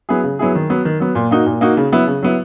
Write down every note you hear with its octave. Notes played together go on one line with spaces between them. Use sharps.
F#3 B3 E4 G#4
C#3
F#3 B3 E4 G#4
D#3
F#3 B3
D#3
F#3 B3
A#2
A#3 D#4 F#4
A#2
A#3 D#4 F#4
C#3
F#3 B3 E4
C#3
F#3 B3 E4